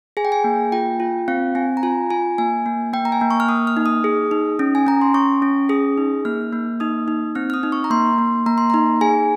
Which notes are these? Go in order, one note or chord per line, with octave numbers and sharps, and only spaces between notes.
G#4 G#5
G5
G#5
A#3
F4 G5
F4
C4 F5
C4 G#5
A#5
F4 G#5
F4 G#5
A#3 G#5
A#3
A#3 G5
A#5
G#5
A#3
C#6
F6
A#3 D#6
F6
D#4
D#6
G#4
D#4
C#4
G#5
C#4 A#5
C6
C#4 C#6
C#4
G#4 D#6
D#4
A#3 F6
A#3
D#4 D#6
D#4
C4 F6
F6
D#6
D#4
C#6
A#5
A#3 C6
A#3
A#3 A#5
C6
D#4 A#5
G#4 G#5